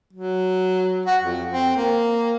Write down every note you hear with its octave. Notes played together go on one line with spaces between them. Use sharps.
F#3
F#4
F2
C4
A#3